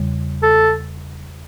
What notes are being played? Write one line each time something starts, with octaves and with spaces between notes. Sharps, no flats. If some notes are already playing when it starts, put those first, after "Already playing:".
Already playing: E2 C#3 G3
A4